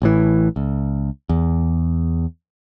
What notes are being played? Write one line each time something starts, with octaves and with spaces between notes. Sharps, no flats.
A1 A2 E3
C#2
E2